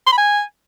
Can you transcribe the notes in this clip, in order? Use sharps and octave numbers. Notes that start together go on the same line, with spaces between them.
C6
B5
G#5